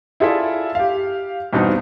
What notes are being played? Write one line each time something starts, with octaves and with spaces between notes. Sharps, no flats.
E4 F4 G#4 A4 D5 E5
G4 F5
E2 G2 B2 B3 C4 D#4